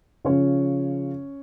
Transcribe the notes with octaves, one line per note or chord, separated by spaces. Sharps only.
C#3 F3 C#4 C#5